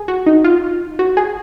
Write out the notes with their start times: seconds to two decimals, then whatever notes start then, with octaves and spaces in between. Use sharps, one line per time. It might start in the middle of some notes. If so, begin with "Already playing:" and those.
Already playing: G#4
0.08 F#4
0.26 D#4
0.44 F4
0.99 F#4
1.17 G#4